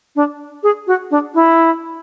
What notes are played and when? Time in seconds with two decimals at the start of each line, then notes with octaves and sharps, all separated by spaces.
0.16 D4
0.63 G#4
0.87 F#4
1.11 D4
1.34 E4